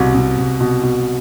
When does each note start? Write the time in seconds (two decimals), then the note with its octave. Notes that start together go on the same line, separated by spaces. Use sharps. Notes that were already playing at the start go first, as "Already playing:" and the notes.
Already playing: C2 B2
0.14 C2
0.38 C2
0.61 B2
0.83 B2